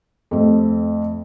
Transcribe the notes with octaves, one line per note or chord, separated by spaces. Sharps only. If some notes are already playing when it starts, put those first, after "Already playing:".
F2 A3